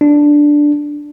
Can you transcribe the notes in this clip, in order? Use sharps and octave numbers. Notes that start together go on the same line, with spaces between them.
D4